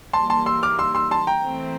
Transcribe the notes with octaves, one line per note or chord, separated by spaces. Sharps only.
E3 G3 A#3 A5 C6
A5 C6
C6 E6
D6 F6
C6 E6
C6 E6
A5 C6
G5 A#5
E3 A3 C4